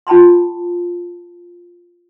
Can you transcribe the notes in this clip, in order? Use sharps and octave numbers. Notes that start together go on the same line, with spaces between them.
F4 G5 A5 B5 C6